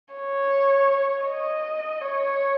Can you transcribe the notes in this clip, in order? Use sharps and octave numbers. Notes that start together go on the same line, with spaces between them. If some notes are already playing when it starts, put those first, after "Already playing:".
C#5
D#5
C#5